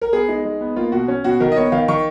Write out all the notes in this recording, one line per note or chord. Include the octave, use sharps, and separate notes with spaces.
A#4
B3 G#4
G#3 D#4
G#3
B3
A#3 F4
B2 F#4
C#4
B2 F#4
D#3 A#4
D#5
B3 C#5
D#3 F5
D#3 C#6